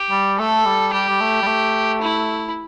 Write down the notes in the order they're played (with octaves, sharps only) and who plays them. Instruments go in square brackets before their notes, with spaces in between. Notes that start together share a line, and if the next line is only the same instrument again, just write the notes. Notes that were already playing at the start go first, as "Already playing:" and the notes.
Already playing: [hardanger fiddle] G4
[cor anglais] G3
[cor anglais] A3 [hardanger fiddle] A4
[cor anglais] G3
[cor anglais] G3 [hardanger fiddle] G4
[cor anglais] G3
A3
G3
A3
[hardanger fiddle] E4